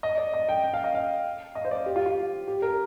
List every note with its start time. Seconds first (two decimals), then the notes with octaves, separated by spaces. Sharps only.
0.03 D#5
0.18 D5
0.34 D#5
0.49 G5
0.64 G5
0.74 F5
0.84 D#5
0.95 F5
1.55 D#5
1.65 C5
1.71 D5
1.86 G4
1.96 F4
2.06 F4
2.48 G4
2.62 A#4